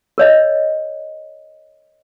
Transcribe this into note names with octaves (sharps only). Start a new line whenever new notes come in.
A#4 C#5 D#5